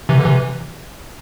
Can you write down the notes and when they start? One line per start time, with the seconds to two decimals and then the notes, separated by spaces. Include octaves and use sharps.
0.09 C3 E3
0.18 D3
0.25 C3 E3